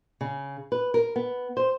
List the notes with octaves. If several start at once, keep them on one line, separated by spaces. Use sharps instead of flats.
C#3
B4
A#4
B3
C5